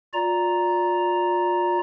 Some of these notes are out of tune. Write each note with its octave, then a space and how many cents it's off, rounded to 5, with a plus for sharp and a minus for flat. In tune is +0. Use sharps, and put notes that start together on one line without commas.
F4 +30 D5 -15 A#5 +0